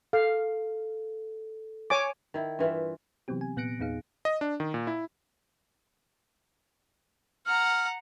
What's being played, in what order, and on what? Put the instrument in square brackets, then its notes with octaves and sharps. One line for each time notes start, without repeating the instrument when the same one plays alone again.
[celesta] A4 [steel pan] F5
[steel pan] C#5 G#5 D6
[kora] D#3 E4
G2 E3 F4 E5
[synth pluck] C3 E3 F#3 B3 C4 G4
G#5
A#2 B3 F#6 A#6 C#7 D7
E2 A#2 B3 D#4 G#4 F5
[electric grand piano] D#5
D4
D#3
A#2
E4
[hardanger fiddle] F#5 A#5 [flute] F6